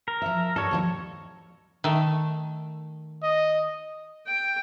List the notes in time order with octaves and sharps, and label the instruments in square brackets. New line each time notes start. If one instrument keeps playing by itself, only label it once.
[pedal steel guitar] A#4
[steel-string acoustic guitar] F3 E5
[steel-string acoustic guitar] G2 G3 [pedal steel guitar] A4 C#5
[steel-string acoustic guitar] D#2 F3 G3
[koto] D#3 A3
[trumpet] D#5
[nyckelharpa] G5